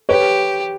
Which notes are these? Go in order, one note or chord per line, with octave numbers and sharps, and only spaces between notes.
G4 B4 C#5